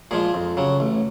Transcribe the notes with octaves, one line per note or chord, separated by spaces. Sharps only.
A#2 F3 G#3 G#4
F2
C#3 F#3
A1